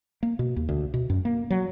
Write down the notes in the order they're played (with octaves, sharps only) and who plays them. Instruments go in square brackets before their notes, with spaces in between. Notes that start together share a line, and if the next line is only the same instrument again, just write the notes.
[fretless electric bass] A#3
B2
D#2
D2
B2
F#2
A#3
F#3